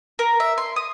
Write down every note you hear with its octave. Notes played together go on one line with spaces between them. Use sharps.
A#4
E5
C6
D#6